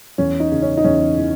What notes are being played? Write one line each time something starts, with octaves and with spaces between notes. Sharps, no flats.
E2 C#4
D#4
C#3
C#4
D#4
E2 C#4
E3